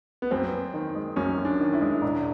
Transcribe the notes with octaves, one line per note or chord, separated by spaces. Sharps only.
B3
F#2 C4
F#2
D#3
G#3
F#2 C#4
F#2
D4
D#3
E4
G#3
E1